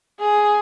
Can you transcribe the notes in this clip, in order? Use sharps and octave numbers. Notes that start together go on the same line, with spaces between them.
G#4